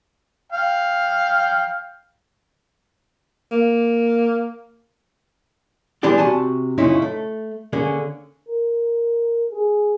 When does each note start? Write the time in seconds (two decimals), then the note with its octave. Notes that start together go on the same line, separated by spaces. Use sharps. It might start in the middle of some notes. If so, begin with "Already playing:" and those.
0.52 F5 G5
3.51 A#3
6.03 E3 G3 G#3 B3 D4 G4
6.18 C3 F#4 G#5 A5
6.78 F#2 A#2 C#3 C#4 D#4 E4
7.02 A3
7.73 D3 A#3 C#4 G#4
8.49 A#4
9.51 G#4